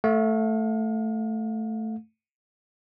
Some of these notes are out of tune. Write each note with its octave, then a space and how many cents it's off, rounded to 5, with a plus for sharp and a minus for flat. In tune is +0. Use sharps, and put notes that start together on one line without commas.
A3 +0 F5 +40